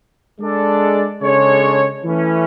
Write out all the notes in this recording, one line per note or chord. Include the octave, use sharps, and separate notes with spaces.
G#3 D4 A4 D5
C#3 G#3 D4 A4 C#5
E3 A3 C#4